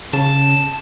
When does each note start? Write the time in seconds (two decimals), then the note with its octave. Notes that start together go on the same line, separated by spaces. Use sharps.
0.13 C#3 A5